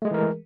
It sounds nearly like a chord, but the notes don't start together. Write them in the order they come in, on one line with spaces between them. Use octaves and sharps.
A3 G#3 G#4 E3 A#4